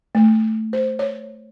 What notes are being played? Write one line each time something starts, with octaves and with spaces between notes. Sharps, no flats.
A3
C5
C#5